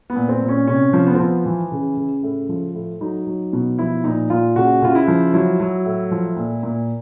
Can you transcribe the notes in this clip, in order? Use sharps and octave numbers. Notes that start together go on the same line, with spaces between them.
B3
A#2
C4
A#2
C#4
C3 C#4
F3
B3
C4
F3 B3
E3
C#3
C#3
A2
F3
A2
F#3 D#4
F#3
B2
F3 E4
A#2 D#4
A#2 F4
C#3 F#4
C#3 F4
E4
F3
F#3 E4
F#3
A2
F3
A#2
A#2